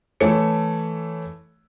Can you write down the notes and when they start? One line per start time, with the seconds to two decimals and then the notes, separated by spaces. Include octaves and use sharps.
0.21 E3 A3 A4 C#5 C#7